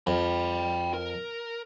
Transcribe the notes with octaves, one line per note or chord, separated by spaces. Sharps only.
F2 G5 B5
A#4